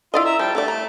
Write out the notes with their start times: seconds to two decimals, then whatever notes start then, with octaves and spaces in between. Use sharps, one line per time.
0.14 E4 F4 D5 D#5
0.25 E5 A#5 E6
0.39 F3 G3 G5 A5
0.55 D3 A3 D5 A5
0.68 A#5